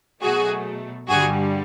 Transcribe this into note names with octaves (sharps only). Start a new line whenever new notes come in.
B2 F#3 A3 F#4 G#4
G2 D3 G3 F#4 G#4